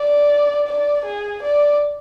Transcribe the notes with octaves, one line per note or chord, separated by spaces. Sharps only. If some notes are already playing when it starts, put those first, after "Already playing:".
Already playing: D5
D5
G#4
D5